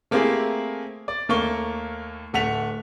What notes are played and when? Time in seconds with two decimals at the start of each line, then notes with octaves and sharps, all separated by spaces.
0.11 A3 A#3 C4 E4 G4 G#4
1.08 D5
1.29 D#2 A3 A#3 C#6 G7
2.33 D1 A3 F#5 B6 F7